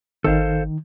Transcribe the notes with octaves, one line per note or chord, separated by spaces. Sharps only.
G#1 D#3 A4 C5 F5